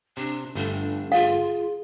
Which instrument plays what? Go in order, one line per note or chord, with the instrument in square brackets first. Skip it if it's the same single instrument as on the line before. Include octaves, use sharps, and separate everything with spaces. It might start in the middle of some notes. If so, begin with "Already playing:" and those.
[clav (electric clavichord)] C3 [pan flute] D4
[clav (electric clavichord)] G1 A3 [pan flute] D4
[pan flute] F4 [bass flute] G#4 [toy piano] F5